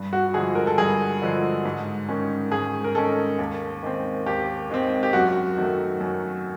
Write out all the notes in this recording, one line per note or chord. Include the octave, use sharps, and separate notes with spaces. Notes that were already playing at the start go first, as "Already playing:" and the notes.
Already playing: G2
F#4
D3 F3 G#3 G#4
A#4
A4
G2 G#4
D3 F3 G#3
G#2
D#3 G#3 C#4
G#2 G#4
A#4
D#3 G#3 C#4 A4
D#2
D#3 G#3 C4
D#2 G4
D#3 G#3 C4
G4
F#2 F#4
D#3 F#3 A3
F#2